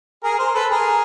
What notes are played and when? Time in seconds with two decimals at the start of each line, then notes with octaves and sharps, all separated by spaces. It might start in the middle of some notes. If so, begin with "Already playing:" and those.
0.23 G#4 A#4
0.39 A#4 C5
0.55 A4 B4
0.71 G#4 A#4